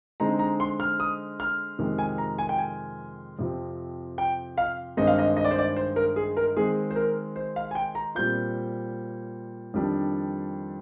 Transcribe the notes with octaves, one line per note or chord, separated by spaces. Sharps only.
D3 G#3 C4 D#4 A#5
A#5
C6
F6
D#6
F6
F2 C3 D#3 G#3
G#5
A#5
G#5
G5
G#5
F2 C3 F3 C4
G5
F5
G2 D#3 G#3 C4 D#4 D#5
F5
D#5
D#5
D5
C5
D5
C5
A#4
G#4
A#4
D#3 G#3 C4 G#4
C5
A#4
C5
F5
G#5
G5
A#5
A#2 G3 C4 F4 G6
F2 D#3 G3 D4